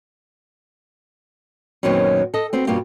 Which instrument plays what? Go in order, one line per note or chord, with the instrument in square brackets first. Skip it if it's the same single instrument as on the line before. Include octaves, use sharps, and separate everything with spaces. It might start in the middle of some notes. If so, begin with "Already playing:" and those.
[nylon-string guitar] F#2 A#2 D#3 F#3 B3 C4
A4 D#5
B3 C4 F#4
G2 B2 A#3 F4 G4